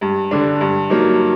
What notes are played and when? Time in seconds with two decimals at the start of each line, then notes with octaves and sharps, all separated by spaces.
0.01 G2
0.31 D3 G3 D4
0.61 G2
0.90 F#3 A#3 D#4